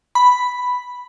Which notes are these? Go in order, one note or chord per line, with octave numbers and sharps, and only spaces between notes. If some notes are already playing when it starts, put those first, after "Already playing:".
B5